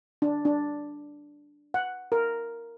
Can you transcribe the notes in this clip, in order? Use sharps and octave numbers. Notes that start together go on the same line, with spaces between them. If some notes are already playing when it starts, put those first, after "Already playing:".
D4
D4
F#5
A#4